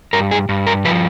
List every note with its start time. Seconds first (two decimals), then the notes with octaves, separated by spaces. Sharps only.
0.13 G2 A#4
0.31 G#4
0.49 G2
0.67 A#4
0.85 F3 B4